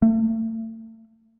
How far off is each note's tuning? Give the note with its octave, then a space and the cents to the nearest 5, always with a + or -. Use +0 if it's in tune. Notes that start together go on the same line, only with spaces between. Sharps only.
A3 +35